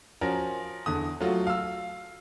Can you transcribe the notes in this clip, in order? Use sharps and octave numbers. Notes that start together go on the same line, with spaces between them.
F3 C#4 F#4 A#4
E2 D3 D#6
F#3 A3 F4 F#4
F5 E6